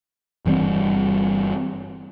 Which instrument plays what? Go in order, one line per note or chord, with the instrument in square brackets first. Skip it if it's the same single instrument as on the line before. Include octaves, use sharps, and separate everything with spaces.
[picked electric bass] G1 E3 G3 C4